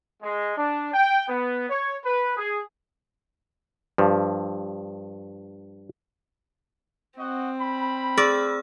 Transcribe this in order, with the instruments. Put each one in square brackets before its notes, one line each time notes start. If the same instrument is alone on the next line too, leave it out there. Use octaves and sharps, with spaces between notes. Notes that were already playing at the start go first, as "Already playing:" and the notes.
[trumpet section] G#3
D4
G5
B3
C#5
B4
G#4
[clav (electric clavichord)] G2 F3
[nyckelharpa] C4 [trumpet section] F#4 D#5 F#5
[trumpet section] G3 B5
[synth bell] G#4 E6 F6 [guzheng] D5